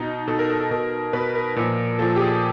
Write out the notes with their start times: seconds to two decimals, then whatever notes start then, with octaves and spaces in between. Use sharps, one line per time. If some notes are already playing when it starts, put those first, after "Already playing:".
Already playing: B2 D#4
0.27 B2 A4
0.39 A#4
0.50 A4
0.60 A4
0.71 B2 A#4
1.13 B2 B4
1.35 A#4
1.56 A#2 F3
1.99 A#2 F3 A4
2.16 G4
2.20 G#4